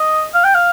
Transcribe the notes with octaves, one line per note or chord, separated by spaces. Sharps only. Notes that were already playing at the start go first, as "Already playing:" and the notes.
Already playing: D#5
F5
G5
F5